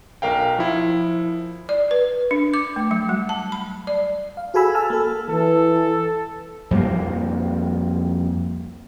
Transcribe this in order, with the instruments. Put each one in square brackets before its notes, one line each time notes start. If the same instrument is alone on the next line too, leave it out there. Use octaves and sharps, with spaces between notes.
[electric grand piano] B1 A#4 F5 G5
F3 E4
[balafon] D5
B4
D4
D6
A3
F#3
G3
A5
B5
D5
[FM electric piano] F5
F#4 G#4 A4 G#5 B5 E6
G#5 A5 E6 F6
A#3 A4
[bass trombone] E3 [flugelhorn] A4
[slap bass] F2 G3 A#3